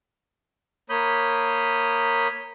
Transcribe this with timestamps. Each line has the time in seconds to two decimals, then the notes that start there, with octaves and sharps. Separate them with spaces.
0.90 A#3 C#5 B5 D#6 G6